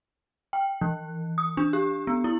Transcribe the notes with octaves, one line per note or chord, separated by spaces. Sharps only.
G5
E3
D#6
D4
G4
B3
E4